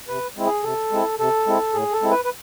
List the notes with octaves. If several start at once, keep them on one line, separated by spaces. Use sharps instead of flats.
C3 B4
G#3 C4 E4
G#4
C3 A4
G#3 C4 E4
C3 A4
G#3 C4 E4
A2 G#4
A4
G#3 C4 E4
B4
B4